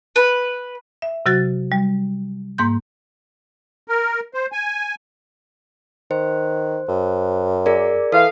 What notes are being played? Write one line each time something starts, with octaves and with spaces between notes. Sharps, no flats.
B4
E5
C3 F#3 F#4 A6
G3
G#2 A#3 C6 G6
A#4
C5
G#5
D#3 C5
F#2
G#4 A#4 D5
E3 A4 F5